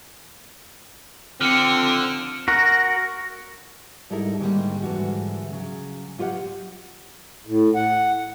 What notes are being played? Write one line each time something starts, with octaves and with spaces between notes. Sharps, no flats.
D3 F3 C4 D4 F6 C#7
F#4 A#4
G#2 G3 D#4 E4 A4 A#4
G#2 D3 D#3 F3 G3 A#3
G#2 D3 E3 G3 F#4
C#3 F#3
F#3 F4 G4 C5 F#5
A2
F#5